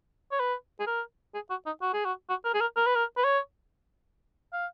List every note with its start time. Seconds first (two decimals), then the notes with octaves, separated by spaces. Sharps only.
0.32 C#5
0.40 B4
0.80 G#4
0.87 A#4
1.35 G#4
1.50 F#4
1.66 D#4
1.82 F#4
1.94 G#4
2.05 F#4
2.30 F#4
2.45 A#4
2.54 G#4
2.61 A#4
2.77 A#4
2.86 B4
2.96 A#4
3.17 B4
3.25 C#5
4.53 F5